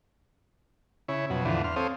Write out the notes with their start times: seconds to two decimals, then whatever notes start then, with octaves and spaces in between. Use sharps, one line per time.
1.08 C#3 E4 C#5
1.30 F2 B2 F#3
1.45 E2 A2 D3 E3 F3
1.64 E2 C6 F6
1.76 C4 A4 C5 C#5 F5 D#6